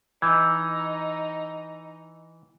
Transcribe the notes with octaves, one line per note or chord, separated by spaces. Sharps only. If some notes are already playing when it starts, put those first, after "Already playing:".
E3 D#4 D#5 E6 G6 G#6